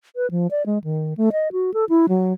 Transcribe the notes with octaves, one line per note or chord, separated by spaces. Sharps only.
B4
F3
D5
G#3
D#3
A3
D#5
F#4
A4
E4
F#3